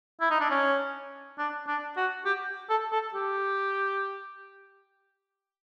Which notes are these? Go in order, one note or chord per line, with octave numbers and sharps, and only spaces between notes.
E4
D#4
D4
C#4
D4
D4
F#4
G4
A4
A4
G4